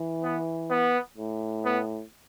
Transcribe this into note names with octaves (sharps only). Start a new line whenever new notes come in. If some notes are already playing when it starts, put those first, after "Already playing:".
Already playing: E3
B3
B3
A2
B3